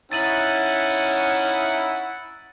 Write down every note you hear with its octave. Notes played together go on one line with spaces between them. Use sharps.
C#4 D#4 E4 F#5 A6 D#7 F#7